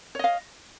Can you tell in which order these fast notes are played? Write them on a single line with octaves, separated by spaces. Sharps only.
C#5 D#5 F5